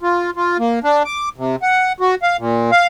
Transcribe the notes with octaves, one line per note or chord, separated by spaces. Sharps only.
F4
F4
A#3
D4
D6
C3
F#5
F#4
F5
A#2
F5